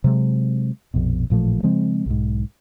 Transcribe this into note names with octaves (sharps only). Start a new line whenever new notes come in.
C3 F#3 G#3
A#1 F2 B2
A1 A#2 F3 A3
C#3 F3 G#3 C4
B1 G#2